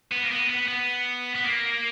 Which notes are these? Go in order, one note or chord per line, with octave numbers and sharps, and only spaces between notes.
B3
A#3
B3
B3
B3
B3
A#3